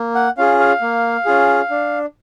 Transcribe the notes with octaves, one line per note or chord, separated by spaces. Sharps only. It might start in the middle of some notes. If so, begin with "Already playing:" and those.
Already playing: A#3
F#5
C#4 F4 G#4 F5
F5
A#3
C#4 F4 G#4
D4